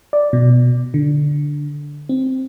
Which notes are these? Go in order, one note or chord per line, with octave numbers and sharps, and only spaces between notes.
D5
B2
D3
C4